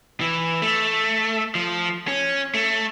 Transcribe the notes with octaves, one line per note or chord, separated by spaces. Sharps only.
E3
A3
F3
C#4
A3